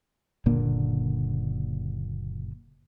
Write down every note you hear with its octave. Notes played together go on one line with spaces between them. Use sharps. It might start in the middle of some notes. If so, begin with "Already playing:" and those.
F#1 A#2 D3 A#3